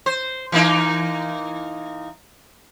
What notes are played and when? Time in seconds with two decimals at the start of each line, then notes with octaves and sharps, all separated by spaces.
0.06 C5
0.52 E3 A#3 D#4